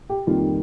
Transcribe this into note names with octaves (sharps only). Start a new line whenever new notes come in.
G4
F2 D#3 G3 A#3 F4